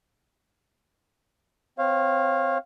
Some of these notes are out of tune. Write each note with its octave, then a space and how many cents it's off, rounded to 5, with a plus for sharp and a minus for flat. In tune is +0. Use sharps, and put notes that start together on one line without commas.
C4 -15 C#5 -35 F5 +0